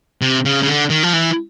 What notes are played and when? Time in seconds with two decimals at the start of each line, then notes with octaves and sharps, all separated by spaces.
0.22 C3
0.45 C#3
0.63 C#3
0.68 D3
0.90 D#3
1.03 F3
1.13 E3